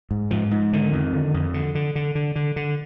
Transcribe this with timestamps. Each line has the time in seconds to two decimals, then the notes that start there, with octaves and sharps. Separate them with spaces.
0.11 G#2
0.31 G#2 F3
0.51 G#2
0.73 D3 D#3
0.93 F2
1.13 D3
1.34 F2
1.54 D3
1.75 D3
1.95 D3
2.15 D3
2.36 D3
2.56 D3